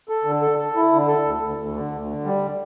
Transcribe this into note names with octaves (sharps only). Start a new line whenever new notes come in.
A4
D3
A4
A4
E4
D3
A4
D2
D2
D2
D3
D2
D3
G3